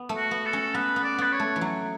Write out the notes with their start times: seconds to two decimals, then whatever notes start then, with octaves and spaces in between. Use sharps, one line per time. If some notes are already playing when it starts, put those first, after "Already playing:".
Already playing: B3
0.09 A3
0.17 F#4
0.31 B3
0.46 A4
0.53 C#4
0.74 B3 B4
0.96 B3
1.04 D5
1.18 B3 B4
1.33 C#5
1.40 A3
1.56 E3
1.61 F#3